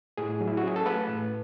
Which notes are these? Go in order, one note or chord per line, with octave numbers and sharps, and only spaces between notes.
A2 G#4
F#3
E4
F#4
C#4 G#4
A4
A3 B4
A2